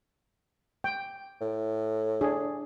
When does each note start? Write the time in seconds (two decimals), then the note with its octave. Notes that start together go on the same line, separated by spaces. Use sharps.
0.84 G5
1.41 A2
2.21 D4 G#4